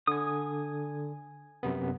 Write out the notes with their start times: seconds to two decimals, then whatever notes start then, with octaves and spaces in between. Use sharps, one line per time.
0.07 D3 G#5 D#6
1.63 F#2 C3 B3